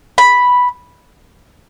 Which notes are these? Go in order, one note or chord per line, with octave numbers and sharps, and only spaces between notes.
B5